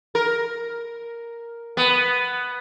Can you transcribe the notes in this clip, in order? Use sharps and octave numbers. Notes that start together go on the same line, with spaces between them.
A#4
B3